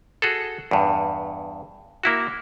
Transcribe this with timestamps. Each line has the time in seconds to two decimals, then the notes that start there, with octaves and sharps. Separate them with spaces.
0.22 F#4 G#4 A4
0.71 E2 G2
2.03 A#3 E4 F#4